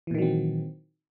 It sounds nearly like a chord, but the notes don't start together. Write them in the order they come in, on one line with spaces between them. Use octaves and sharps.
E3 A#2 D#3 F#3 C4